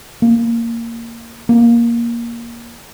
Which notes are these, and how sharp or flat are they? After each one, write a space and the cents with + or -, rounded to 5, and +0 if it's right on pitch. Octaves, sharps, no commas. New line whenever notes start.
A#3 -10
A#3 +10